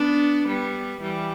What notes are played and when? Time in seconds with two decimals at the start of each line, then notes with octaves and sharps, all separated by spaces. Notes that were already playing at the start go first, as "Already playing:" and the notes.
Already playing: B3 D4
0.47 G3 B3
1.01 E3 G3